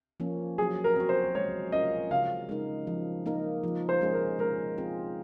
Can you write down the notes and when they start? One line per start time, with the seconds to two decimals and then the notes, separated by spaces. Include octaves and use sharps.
0.20 F3 A#3 C#4
0.58 F#3 G#4
0.84 A#4
0.96 C4 F#4
1.09 C5
1.35 G#3 C#5
1.72 C#4 F4 A#4 D#5
2.11 C#3 F5
2.49 G#3 D#4 A#4
2.87 F3
3.26 A#3 D#4 A#4
3.64 F3
3.89 C5
4.01 G#3 C#4 G#4
4.14 A#4
4.39 G#3 A#4
4.78 C4 F4 G#4